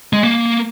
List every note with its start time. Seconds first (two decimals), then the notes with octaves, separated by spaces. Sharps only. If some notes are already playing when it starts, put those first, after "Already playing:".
0.13 G#3
0.23 A#3